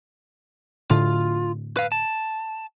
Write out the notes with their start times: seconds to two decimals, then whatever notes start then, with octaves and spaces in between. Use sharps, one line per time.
0.91 A2 D3 F4
1.77 B4 F5
1.92 A5